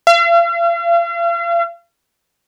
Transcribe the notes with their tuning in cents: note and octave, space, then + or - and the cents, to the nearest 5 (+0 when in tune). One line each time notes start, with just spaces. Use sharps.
F5 -40